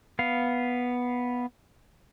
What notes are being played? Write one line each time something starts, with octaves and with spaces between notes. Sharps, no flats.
B3 F5